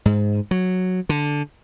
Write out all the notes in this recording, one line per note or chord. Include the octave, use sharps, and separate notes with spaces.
G#2
F#3
D3